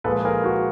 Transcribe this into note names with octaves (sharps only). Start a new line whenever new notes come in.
A#2 F3 G#3 A4 B4
G#4 A#4
F#4